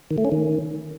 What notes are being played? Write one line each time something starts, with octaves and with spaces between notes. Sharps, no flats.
D#3
A3
C#4
D#3